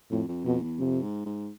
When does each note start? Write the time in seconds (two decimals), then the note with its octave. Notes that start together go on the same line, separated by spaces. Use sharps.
0.11 F2 A2
0.28 F2
0.45 F2 B2
0.63 E2
0.79 F2 C3
1.03 G#2
1.26 G#2